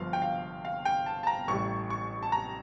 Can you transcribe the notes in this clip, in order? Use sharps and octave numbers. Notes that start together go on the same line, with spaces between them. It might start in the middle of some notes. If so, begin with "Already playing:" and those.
Already playing: G1 G2 F3 F5
G5
F5
F5
G5
A5
A5
A#5
A1 A2 G3 C#6
C#6
A5
A#5